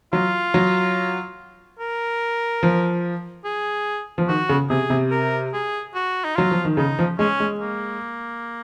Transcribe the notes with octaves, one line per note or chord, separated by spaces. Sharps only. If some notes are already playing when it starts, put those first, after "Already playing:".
F#3 F4
F#3
A#4
F3
G#4
F3
D#3 F#4
C#3
C3 G#4
C3
A#4
G#4
F#4
D#4
F#3 F4
F3
D#3
C#3 D#4
F3
G#3 C#4
G#3
A#3